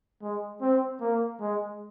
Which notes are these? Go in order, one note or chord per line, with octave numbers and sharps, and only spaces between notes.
G#3
C4
A#3
G#3